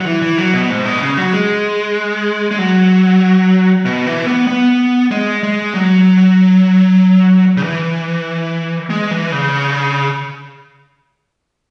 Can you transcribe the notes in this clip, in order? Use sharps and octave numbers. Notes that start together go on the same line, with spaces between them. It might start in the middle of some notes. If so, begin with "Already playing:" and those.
F#3
E3
E3
F#3
B2
G#2
B2
C#3
F#3
G#3
G#3
F#3
B2
E3
B3
B3
G#3
G#3
F#3
C#3
E3
G#3
E3
C#3